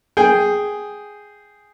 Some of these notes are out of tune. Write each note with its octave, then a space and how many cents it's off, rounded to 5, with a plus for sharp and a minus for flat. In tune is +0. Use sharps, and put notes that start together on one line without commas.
G#4 +0 G5 +0